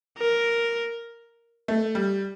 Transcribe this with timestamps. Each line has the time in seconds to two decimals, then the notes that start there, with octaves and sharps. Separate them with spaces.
0.18 A#4
1.68 A3
1.95 G3